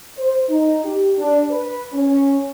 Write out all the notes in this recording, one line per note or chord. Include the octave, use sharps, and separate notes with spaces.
C5
D#4
G4
D4
B4
C#4